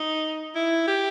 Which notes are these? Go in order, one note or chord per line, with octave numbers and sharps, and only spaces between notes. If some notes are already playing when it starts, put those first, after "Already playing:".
Already playing: D#4
E4
G4